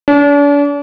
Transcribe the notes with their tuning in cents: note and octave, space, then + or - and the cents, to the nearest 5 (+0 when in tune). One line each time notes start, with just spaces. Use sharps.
D4 -40